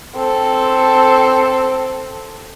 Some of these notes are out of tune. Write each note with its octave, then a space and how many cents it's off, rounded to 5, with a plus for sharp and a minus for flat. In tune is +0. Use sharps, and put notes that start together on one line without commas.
C4 +0 A4 +0